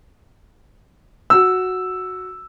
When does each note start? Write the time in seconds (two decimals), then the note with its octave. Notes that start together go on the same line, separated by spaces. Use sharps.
1.30 F#4 E6